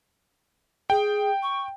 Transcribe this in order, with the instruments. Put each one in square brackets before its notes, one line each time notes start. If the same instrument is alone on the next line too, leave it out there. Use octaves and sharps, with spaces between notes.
[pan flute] G#4 [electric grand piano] G5
[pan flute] C#6